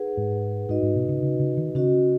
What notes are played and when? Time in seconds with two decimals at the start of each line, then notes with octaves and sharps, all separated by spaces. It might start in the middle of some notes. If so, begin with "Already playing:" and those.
Already playing: D#4 G#4 B4 F#5
0.17 G#2
0.69 G#2 D#4 F#4 B4 D#5
0.83 G#2
0.95 B2
1.09 C#3
1.23 C#3
1.39 C#3
1.57 D#3
1.75 C#3 C#4 F#4 D#5